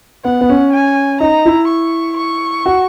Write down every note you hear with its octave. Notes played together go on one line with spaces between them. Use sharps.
B3 F#5
B3
C#4
G#5
D#4 A#5
E4
C#6
C#6
F#4